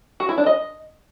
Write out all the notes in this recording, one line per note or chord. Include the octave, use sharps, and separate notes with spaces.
F#4
E4
D4
D#5